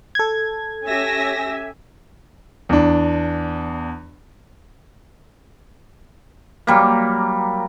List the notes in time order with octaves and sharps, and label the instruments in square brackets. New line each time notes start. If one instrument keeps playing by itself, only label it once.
[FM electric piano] A4 G#6
[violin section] C#4 E6 A#6 [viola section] G4 E5 G#5
[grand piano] E2 D4
[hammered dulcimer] F#3 G3 A#3